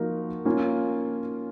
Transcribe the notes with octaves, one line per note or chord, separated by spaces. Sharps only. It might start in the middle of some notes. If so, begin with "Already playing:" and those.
Already playing: F3 A#3 D#4 F#4 A#4
A#3 C#4 F4